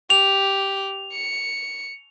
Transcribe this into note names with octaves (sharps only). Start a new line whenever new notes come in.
G4 F7
C#7